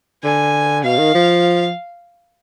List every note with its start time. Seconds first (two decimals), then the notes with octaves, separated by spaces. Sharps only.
0.24 D3 G#5
0.84 B2 F5
0.99 D#3
1.15 F3